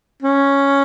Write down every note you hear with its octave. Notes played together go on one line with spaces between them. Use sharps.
C#4